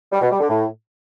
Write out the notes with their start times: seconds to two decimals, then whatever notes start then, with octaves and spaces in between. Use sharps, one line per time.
0.13 G3
0.22 B2
0.31 G3
0.40 D3
0.49 A2